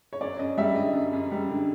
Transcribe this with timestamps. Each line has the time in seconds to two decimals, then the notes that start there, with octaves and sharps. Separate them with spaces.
0.13 C#5
0.21 F#2 D5
0.39 F#2 D#5
0.57 G3 E5
0.76 D3 D#5
0.94 F#2
1.13 F#2
1.32 G3
1.50 D3